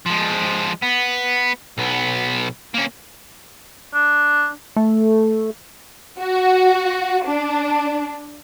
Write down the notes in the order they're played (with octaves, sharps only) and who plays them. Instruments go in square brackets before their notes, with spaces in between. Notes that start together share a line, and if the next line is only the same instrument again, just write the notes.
[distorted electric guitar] F3 G#3
B3
B1 B3
A#3 C#4
[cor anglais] D4
[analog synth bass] A3
[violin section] F#4
D4